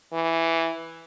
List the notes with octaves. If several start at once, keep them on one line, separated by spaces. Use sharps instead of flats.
E3